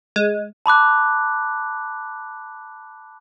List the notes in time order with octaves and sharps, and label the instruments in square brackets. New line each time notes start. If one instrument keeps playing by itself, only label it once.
[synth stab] G#3
[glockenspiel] A5 B5 D6 F#6